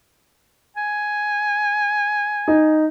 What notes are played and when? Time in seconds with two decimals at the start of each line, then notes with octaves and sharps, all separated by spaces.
0.77 G#5
2.48 D#4